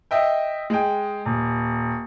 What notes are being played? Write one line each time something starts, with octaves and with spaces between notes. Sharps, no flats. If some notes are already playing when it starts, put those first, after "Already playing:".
D#5 E5 G5
G#3 G5
D#1